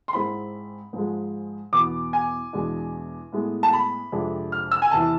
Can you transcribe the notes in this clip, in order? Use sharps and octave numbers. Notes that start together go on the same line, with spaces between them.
C6
G#2 G#3 C4 E4 B5
G#2 F3 G#3
E2 B2 B3 D6
G#5
E2 B2 G#3 D4
A2 G#3 B3
A5
B5
F2 C3 G#3 D4
F6
E6
G#5
E2 C3 E3 A5